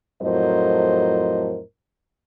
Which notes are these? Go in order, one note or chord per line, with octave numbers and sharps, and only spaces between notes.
F2 A2 F#3 A#4 C5 D#5